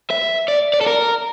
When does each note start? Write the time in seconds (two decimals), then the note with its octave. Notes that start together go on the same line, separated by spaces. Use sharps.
0.10 E5
0.48 D5
0.74 D5
0.81 A4
0.87 A#4